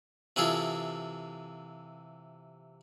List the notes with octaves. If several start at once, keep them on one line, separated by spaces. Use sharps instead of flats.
C3 E3 F4 G#4 A4